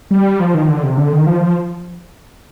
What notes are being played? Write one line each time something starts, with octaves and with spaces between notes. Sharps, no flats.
G3
F3
D#3
D3
C3
D3
D#3
F3
F3